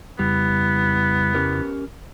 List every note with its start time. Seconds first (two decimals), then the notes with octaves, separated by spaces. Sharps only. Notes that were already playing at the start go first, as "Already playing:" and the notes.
0.19 F2 C#3 G3 B3 E4
1.35 C#4 G4 A#4